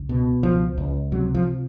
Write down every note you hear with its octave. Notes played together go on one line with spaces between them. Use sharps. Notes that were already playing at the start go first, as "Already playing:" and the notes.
Already playing: C#2
B2
C#2 F3
C#2
C3 F#3
F3